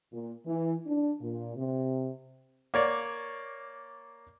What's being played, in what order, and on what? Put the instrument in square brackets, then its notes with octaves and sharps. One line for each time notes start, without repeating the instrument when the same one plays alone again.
[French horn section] A#2
E3
D4
A#2
C3
[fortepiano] A#3 C#5 D5